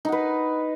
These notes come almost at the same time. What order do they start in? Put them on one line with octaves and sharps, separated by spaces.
D#4 F#5 B4